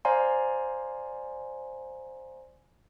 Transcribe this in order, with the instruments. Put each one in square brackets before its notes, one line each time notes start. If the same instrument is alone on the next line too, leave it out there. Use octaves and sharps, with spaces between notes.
[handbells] C5 D5 F5 G#5 A#5 C6